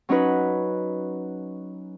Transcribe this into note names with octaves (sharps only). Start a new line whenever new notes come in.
F#3 C#4 D#4 F#4 B4